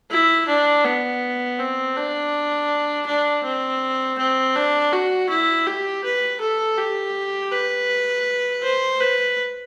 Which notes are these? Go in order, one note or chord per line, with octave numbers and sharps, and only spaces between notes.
E4
D4
B3
C4
D4
D4
C4
C4
D4
F#4
E4
G4
B4
A4
G4
B4
C5
B4